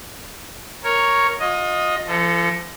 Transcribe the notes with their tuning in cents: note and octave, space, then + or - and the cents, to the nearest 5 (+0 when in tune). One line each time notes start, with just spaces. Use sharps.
A#4 +0 C#5 +0
F4 +35 D#5 +0
F3 -35 A4 +10